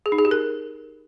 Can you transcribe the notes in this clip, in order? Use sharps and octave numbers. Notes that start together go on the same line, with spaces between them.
G#4
D#4
G#4
G4
A#4